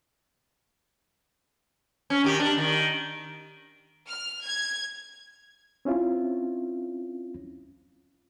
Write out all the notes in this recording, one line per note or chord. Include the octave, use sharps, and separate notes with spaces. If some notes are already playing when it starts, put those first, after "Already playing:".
C#4
D#3 G4
D4
D#3
F6
G#6
C4 C#4 E4 F4